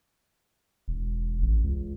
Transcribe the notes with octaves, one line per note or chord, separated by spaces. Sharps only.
E1
A1
C#2